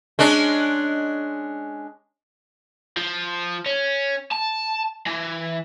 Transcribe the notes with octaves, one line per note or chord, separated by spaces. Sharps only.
G#3 C#4 D4
F3
C#4
A5
E3